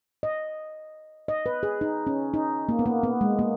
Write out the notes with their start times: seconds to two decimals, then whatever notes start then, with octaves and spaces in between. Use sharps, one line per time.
0.23 D#5
1.28 D#5
1.46 B4
1.63 G#4
1.81 D#4
2.07 C#4
2.34 D#4
2.69 A#3
2.79 B3
2.86 A#3
3.03 B3
3.21 G#3
3.39 A#3